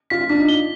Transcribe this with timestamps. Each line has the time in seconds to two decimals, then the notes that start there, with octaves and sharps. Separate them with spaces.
0.10 F4 B6
0.21 F4
0.29 D4 B6
0.39 D#4
0.49 G7